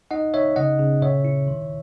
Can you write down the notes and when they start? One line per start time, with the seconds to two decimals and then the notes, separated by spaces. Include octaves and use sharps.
0.11 D#4 D#5 F#5
0.34 D#4 C#5 E5
0.56 C#3 D#5 F#5
0.79 C#3
1.02 A#2 C#5 E5
1.25 E4
1.48 D#3